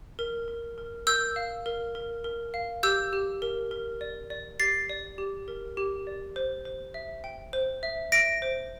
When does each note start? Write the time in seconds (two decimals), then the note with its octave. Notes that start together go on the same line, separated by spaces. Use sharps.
0.19 A#4
0.48 A#4
0.78 A#4
1.07 A#4 E6 G6
1.36 F5
1.66 A#4
1.95 A#4
2.24 A#4
2.54 F5
2.83 G4 E6 G6
3.13 G4
3.42 A#4
3.71 A#4
4.01 D5
4.30 D5
4.60 G4 A6 C7
4.90 D5
5.18 G4
5.48 A#4
5.77 G4
6.07 D5
6.36 C5
6.65 C5
6.94 E5
7.24 G5
7.53 C5
7.83 E5
8.12 E5 A#6 D7
8.42 C5